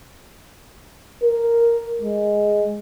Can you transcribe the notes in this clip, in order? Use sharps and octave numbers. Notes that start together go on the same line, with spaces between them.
A#4
G#3